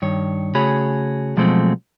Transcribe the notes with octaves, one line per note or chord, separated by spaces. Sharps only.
G2 D#3 C#5
C#3 A3 F#4 G#4 C#5 B5
B2 F3 F#3 G#3 A3 C4